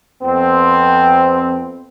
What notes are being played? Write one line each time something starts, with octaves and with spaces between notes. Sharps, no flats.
F2 B3 C4